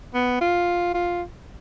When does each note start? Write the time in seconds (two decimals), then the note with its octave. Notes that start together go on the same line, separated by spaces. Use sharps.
0.14 B3
0.41 F4
0.94 F4